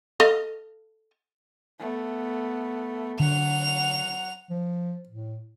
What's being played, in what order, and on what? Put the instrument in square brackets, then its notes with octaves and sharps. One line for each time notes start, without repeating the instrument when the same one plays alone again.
[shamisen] A4 D#5 F5
[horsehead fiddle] A3 B3
[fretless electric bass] D3 [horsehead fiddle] F#3 F#5 [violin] F7
[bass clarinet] F3
A2